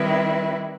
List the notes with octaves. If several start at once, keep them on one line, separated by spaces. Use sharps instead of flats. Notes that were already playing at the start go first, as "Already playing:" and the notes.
Already playing: D#3 G3 C4 E4 B4